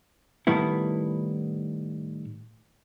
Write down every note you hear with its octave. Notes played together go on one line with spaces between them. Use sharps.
A2 D#3 G3 B3 E4